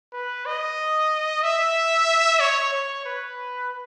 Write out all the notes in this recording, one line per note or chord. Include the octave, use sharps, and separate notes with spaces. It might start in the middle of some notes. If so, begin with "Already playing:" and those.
B4
D#5
E5
C#5
C#5
B4